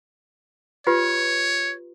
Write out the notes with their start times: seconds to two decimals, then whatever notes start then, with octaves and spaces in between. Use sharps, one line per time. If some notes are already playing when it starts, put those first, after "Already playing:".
0.87 F4 G4 B4 C#5